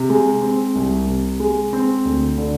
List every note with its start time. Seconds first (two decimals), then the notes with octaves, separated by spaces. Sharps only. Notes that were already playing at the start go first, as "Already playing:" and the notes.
Already playing: C3
0.10 G#3
0.42 C4
0.75 C2
1.07 C3
1.40 G#3
1.73 C4
2.05 D2
2.38 D3